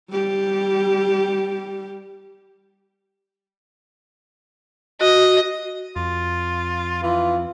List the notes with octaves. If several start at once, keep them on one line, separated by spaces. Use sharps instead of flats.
G3 G4
F#4 D#5
F2 F4
E3 F4